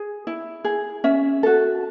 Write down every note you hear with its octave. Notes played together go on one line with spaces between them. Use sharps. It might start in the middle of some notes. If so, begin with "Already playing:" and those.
Already playing: G#4
E4
G#4
C#4 E5
F#4 A4